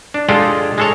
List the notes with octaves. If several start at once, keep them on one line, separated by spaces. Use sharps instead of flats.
D4
G#3 D4 F4 G4 A4
G#3 A4 C#5